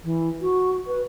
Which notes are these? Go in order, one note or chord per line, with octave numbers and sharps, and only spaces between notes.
E3
F#4
B4